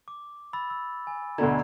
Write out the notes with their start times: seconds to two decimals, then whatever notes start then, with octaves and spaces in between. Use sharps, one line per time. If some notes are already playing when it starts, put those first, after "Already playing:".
0.08 D6
0.53 B5 E6 A6
0.70 E6
1.07 G#5
1.38 D2 B2 D3 A#5 G#6